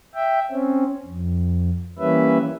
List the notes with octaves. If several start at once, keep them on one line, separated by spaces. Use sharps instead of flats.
E5 G5
C4 C#4
F2
E3 G3 A#3 C#4 B4 E5